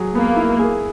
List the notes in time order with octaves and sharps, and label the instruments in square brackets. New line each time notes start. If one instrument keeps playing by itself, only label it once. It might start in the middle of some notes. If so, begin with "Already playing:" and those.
Already playing: [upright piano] F#3 G#4
[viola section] A#3 [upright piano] B3
[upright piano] E4
G#4